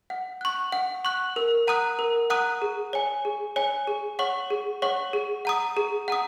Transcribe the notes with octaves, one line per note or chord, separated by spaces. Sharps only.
F#5
C#6 F#6
F#5
C#6 F#6
A#4
F#5 A#5 D#6 F#6
A#4
F#5 A#5 D#6 F#6
G#4
C#5 G#5
G#4
C#5 G#5
G#4
C#5 F#5 C#6
G#4
C#5 F#5 C#6
G#4
F#5 A#5 D#6
G#4
F#5 A#5 D#6